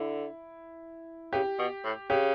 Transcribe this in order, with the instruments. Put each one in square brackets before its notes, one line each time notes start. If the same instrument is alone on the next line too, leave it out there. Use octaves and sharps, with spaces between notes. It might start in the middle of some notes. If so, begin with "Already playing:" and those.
Already playing: [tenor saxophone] D3 [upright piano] E4
[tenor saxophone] C#3 [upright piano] G4
[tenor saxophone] B2
A2
[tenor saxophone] C#3 [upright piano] G4